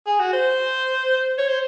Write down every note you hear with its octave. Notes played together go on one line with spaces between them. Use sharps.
G#4
F#4
C5
C#5
C5